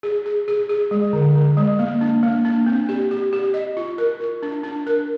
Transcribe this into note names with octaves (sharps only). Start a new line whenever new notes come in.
G#4
G#4
G#4
G#4
G#3
D3
D3
G#3
A#3
D4
A#3
D4
C4
G4
G4
G4
D#5
F4
A#4
F4
D4
D4
A#4